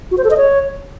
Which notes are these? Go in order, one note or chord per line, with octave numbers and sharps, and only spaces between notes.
F#4
C5
A4
D#5
C#5